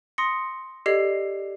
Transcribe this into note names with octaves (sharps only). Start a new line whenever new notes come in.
C6 D#6 A#6 C#7
G4 A4 D5 D#5 G#6 C7